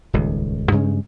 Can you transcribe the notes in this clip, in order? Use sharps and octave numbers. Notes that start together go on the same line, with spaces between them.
D#1 C#2 G2 D#3
G2 C#3 G#3 C#4